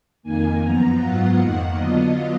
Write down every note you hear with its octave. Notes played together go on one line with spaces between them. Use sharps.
F2 D#3 A#3 G#5
F#2 F3 B3 A#5
G#2 F#3 B3 F4 F#5
F2 D#3 A#3
D3 F#3 B3 F4 D#5